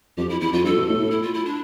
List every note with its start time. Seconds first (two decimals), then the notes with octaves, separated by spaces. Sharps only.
0.18 F2 G4
0.29 E4
0.41 E2 E4
0.53 F2 F4
0.64 G2 A4
0.76 B2
0.88 A2
0.99 A2
1.11 E4
1.22 F4
1.34 E4
1.45 D4